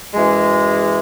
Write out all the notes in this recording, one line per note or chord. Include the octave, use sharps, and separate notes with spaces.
F#2 E3 G#3